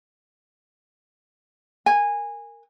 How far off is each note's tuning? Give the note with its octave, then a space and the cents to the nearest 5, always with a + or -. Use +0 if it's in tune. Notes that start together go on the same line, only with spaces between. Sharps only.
A#4 -15 G#5 -15